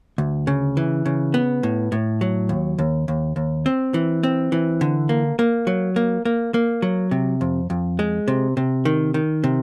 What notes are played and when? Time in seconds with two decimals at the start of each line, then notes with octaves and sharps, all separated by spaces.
0.18 D2
0.47 C#3
0.77 E3
1.06 C#3
1.34 B3
1.63 A2
1.92 A2
2.21 F#3
2.49 D#2
2.79 D#2
3.08 D#2
3.36 D#2
3.66 C4
3.94 E3
4.23 C4
4.52 E3
4.81 D3
5.09 A#3
5.39 A#3
5.67 F#3
5.96 A#3
6.25 A#3
6.54 A#3
6.82 F#3
7.11 C3
7.41 F2
7.70 F2
7.99 G#3
8.28 C3
8.57 C3
8.85 D#3
9.14 D#3
9.44 C3